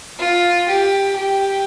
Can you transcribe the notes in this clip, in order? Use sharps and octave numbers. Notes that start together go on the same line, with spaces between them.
F4
G4
G4